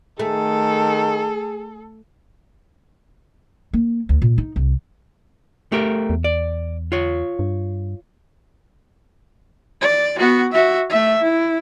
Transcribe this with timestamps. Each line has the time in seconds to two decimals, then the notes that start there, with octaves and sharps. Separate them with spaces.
0.19 D#3 A3 G#4 A4
3.73 A#3
4.09 D2
4.22 A#2
4.38 D#4
4.56 C2
5.72 A3 G4 A#4
6.10 E2
6.24 D5
6.92 F4 C#5
7.39 G2
9.81 D5
10.18 B3 F#4
10.52 F#4 E5
10.90 A3 E5
11.22 E4